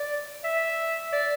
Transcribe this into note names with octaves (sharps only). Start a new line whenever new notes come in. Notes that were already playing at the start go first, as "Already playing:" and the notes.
Already playing: D5
E5
D5